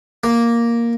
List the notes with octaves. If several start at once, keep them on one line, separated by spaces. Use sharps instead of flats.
A#3